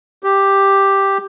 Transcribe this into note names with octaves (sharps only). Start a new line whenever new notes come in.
G4